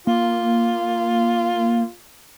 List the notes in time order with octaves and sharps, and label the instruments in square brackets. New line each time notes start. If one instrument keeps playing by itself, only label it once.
[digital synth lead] A#3 [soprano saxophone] F4